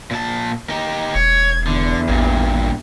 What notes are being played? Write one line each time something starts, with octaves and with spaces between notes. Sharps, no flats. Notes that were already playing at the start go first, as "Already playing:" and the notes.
A#2 A5
D#4 G4
E1 C#5 G#6
E2 D3
A1 G2 A#2